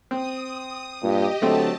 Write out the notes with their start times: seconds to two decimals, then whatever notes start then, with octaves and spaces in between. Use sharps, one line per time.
0.11 C4 D#6
1.03 G2 A#2 G4 D#5
1.42 D3 F#3 A3 C4 A5